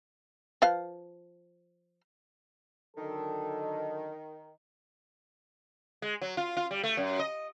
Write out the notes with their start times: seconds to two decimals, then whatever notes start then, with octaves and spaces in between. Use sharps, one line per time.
0.62 F3 B4 F5
2.97 D3 D#3 F#3 A4
6.02 G#3
6.21 F#3
6.37 F4
6.57 F4
6.71 G3
6.84 A3
6.97 F#2
7.19 D#5